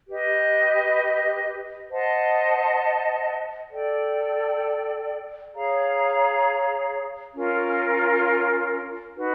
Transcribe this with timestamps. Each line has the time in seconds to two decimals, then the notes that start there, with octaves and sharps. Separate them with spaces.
0.08 G4 B4 D#5
1.89 C5 D#5 F#5 A5
3.70 A4 D5 G5
5.52 G#4 C#5 F5 A#5
7.34 C#4 F4 A#4
9.16 D#4 F#4 B4